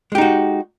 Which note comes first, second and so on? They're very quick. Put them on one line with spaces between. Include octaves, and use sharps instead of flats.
G#3 G4 D#4 F#4